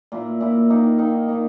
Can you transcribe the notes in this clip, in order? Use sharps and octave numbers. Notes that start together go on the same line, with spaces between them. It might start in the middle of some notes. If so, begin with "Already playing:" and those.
A#2 A#3 E4
A#2 A#3 E4
D#3 A#3 D#4
D#3 A#3 D#4
D#3 A#3 D#4